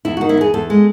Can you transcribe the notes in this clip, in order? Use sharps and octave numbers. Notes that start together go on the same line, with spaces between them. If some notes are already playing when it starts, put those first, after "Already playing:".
E2 E4
D#3 F#4
E4
E2 G#4
E2 A4
G#3